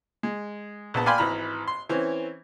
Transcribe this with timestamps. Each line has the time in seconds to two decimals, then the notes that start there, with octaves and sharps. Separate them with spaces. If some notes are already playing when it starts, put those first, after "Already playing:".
0.23 G#3
0.94 A#1 B3 A5
1.06 D5 F5 G5 G#5 B5 C6
1.18 G#1 E3 A#5 B5 F6
1.67 C6
1.89 E3 C4 C#4